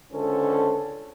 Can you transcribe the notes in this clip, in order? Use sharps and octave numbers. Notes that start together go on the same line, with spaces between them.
C#2 D3 C#4 A4 C5